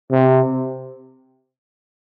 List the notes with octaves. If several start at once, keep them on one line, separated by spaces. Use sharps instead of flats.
C3